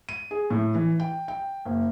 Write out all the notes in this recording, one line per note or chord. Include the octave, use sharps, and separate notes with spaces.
D#7
G#4
A2
E3
G5
G5
F#1